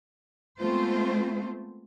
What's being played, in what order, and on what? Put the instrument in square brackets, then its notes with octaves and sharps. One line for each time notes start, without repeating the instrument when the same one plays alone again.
[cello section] G#3 A3 B3 C4 F4 C5